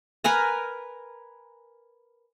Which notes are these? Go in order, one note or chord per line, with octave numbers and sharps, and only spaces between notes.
A#4 B4 G#5 A#5